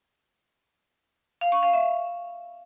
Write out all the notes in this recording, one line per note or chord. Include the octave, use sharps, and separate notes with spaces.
F5
C#6
F5
E5